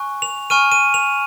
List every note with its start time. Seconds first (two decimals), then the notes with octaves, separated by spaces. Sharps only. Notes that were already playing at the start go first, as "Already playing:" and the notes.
Already playing: G#5 C#6 F#6
0.22 F7
0.50 G#5 C#6 F6 D#7
0.72 D#7
0.94 F7